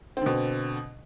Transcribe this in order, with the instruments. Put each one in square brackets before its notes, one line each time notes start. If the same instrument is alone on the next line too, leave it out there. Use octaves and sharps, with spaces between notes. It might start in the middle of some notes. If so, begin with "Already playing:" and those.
[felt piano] C4
D3
B2